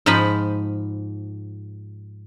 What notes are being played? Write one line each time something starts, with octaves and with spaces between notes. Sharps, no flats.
G#2 F3 D#4 A5 B5